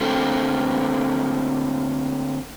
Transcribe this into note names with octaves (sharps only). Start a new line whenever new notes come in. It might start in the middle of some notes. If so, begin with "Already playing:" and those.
D3 A3 A#3 C4